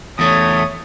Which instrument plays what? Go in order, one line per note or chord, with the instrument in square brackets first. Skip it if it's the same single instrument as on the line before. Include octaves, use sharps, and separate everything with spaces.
[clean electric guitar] E2 A3 [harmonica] C#5 [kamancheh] D#6